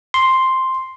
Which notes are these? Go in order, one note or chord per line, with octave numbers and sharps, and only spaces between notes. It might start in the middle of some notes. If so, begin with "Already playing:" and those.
C6